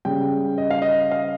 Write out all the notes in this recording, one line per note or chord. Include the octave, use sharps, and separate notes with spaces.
C#3 G3 G5
D#5
F5
D#5
F5